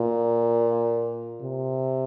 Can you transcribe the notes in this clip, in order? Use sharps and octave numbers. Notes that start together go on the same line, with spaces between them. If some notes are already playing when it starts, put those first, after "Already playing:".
Already playing: A#2
C3